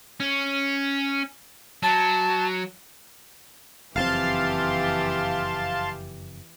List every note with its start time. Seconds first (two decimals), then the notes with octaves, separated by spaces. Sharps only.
0.20 C#4
1.83 F#3 A5
3.96 F#1 F2 E3 C4 G4 F5 A5 C6